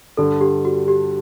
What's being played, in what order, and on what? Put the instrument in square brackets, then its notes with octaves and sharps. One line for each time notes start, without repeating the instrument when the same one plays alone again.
[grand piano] G2 D3 G3 [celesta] A4
[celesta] G4
F#4
G4